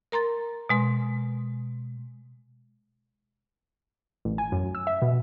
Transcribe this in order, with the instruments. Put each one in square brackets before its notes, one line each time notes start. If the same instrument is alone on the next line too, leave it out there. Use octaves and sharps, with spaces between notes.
[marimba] A#4 A#5 C6 A6
B2 G#3 C6
[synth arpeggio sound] A1
G#5
F#2
E6
E5
B2